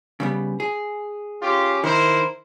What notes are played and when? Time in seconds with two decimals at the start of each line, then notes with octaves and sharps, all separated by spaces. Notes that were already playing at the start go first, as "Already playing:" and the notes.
0.20 C#3 G3 B3
0.60 G#4
1.42 C#4 F4 G4
1.84 D#3 E4 A#4 C5